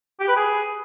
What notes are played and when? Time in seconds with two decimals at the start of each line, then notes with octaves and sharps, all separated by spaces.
0.20 G4
0.28 B4
0.36 G#4